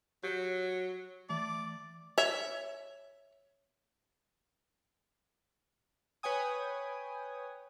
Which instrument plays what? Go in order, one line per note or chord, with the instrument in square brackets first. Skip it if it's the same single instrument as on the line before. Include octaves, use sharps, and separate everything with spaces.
[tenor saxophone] F#3 [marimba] G4 C#5
[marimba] E3 A3 [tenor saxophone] D5
[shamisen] C#5 E5
[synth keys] B4 C#5 G5 G#5 D#6